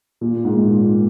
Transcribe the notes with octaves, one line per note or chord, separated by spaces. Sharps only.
A#2
G#2
A#2